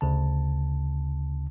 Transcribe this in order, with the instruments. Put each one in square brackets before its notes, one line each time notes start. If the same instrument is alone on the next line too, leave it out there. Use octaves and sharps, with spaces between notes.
[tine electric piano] D2 C#3 A5